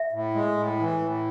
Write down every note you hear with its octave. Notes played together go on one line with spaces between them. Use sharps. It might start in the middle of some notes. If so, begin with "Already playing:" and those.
Already playing: E5
A2
G#3
A2
E3
A2